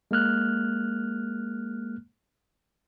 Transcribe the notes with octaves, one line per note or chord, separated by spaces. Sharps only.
G#3 A#3 F6 F#6